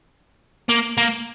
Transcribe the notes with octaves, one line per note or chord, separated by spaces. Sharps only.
A#3
A#3